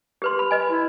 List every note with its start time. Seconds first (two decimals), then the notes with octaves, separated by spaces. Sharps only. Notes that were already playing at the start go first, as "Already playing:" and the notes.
0.22 G4 B4 C6
0.39 B5
0.51 B4 D#5 G#5
0.70 E4